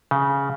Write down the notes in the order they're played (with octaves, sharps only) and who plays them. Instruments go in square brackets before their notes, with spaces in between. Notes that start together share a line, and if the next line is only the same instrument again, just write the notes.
[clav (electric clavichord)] C#3